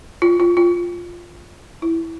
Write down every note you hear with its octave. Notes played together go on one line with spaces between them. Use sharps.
F4
F4
F4
E4